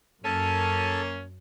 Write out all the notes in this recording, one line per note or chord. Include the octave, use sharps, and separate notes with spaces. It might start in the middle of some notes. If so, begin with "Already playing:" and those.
F#2 A#3 C#4 A4 A5